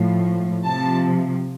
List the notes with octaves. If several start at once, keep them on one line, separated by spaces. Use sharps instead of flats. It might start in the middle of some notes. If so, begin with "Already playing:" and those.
Already playing: A2 F3
C3 F3 A5